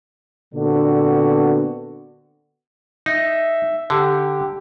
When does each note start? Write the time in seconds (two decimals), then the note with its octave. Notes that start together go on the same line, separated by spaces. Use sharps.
0.54 A#2 D3 B3 C4 D4 F#4
3.06 D#4 E5
3.90 D3 G4